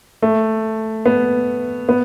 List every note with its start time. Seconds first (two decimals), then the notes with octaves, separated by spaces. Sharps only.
0.22 A3
1.06 B3
1.89 B3